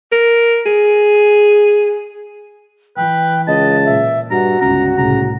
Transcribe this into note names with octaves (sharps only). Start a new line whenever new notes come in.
A#4
G#4
E3 B4 G5
C#2 D#5 A5
A#2 E5
G2 F#4 A#5
G1 C#2 C#4 A#5
C2 A2 C#3 A#5